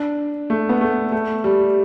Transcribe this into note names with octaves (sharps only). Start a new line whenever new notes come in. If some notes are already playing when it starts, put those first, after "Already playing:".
Already playing: D4
A3
B3
A3
A3
G3